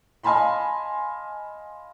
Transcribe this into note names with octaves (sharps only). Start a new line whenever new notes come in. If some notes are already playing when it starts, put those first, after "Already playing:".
D#5 F5 G#5 A5 B5 C6